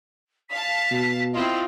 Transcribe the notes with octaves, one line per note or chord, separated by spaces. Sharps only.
F5 A5 B6
B2
C4 E4 F4 D#5